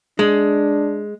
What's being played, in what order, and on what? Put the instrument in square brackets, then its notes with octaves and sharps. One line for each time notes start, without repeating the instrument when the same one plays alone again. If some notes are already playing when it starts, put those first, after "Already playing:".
[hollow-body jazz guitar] G#3 [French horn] D4